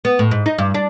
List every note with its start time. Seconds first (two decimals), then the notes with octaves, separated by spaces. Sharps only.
0.05 B3
0.19 A2
0.31 G#2
0.46 D#4
0.58 G2
0.74 D4